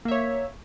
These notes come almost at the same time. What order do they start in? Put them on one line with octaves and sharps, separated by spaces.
A#3 E5 C#5